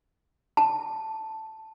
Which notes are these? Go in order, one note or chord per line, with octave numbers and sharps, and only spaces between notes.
A5